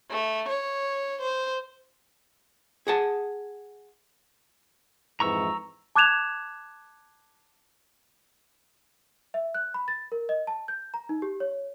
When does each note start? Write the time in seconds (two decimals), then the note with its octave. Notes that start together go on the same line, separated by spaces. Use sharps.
0.11 A3
0.48 C#5
1.21 C5
2.87 G#4 F#5 A5
5.20 F2 G#2 E3 A#5 C#6 E6
5.95 A5 D6 F#6 G#6 E7 F7
9.34 E5
9.55 F#6
9.74 B5
9.88 A6
10.12 A#4
10.29 D#5
10.47 A5
10.68 G6
10.94 A#5
11.09 D#4
11.22 G4
11.40 C#5